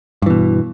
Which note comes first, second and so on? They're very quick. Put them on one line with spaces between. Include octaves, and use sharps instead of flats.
G2 E3 B2